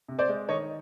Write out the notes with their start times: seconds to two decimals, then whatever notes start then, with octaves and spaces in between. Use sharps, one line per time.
0.08 C3
0.19 C5 D5
0.28 G#3
0.49 D#3 C#5 D#5